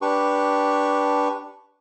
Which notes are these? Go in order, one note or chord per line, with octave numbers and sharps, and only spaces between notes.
D4 G4 B4 C#6